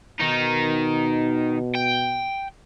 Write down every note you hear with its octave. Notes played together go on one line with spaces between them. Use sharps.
B2 D#3 D#4
G5